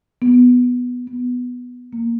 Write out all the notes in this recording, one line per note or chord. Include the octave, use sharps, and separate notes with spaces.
B3
B3
A#3